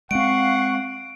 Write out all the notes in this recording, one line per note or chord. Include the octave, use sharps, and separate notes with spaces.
G#3 A#3 C4 F5 F#5 C#6 D7